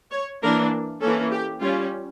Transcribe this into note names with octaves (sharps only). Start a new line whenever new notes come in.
C#5
E3 A#3 D4 A#4
E3 A#3 C#4 A4
G4
G3 C#4 F4